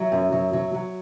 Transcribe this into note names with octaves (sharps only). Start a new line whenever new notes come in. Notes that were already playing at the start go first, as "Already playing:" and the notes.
Already playing: F#3 E5
F#2
F#3
F#3
F#3